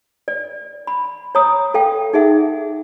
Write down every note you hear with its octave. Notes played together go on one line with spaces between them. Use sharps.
D5
B5
C#5 A#5 D#6
A4 F5 G5
D#4 G#4 E5 F#5